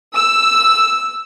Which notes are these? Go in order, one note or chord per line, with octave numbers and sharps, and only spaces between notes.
E6